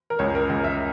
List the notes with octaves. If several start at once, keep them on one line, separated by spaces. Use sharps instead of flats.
A#4
C#2 C#5
A#4
C#2
E5